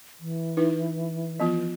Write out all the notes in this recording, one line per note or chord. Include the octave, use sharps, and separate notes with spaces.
E3
D#4 E4 B4
F3 B3 F4